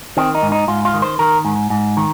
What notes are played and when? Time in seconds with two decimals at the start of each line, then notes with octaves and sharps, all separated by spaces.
0.17 D#3 C4
0.35 D#4
0.42 G#2
0.52 D#4
0.68 G#2 F4
0.85 F4
0.94 D#3
1.02 C5
1.19 D#3 A#4
1.45 G#2
1.70 G#2
1.97 D#3